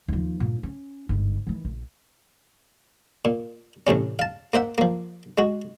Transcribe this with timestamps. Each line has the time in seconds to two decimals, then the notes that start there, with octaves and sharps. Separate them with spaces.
0.08 D#2 F3
0.40 G2 A#2
0.63 C#4
1.09 G1 G#2
1.47 D#3 E3
1.65 A#1
3.25 A#2
3.87 A1 A2 C3 C#4
4.19 F5 A5
4.54 A#3 C5 E5 F#5
4.78 F3 A#3
5.38 G#3 F#4